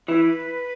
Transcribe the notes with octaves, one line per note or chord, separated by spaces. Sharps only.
E3 B4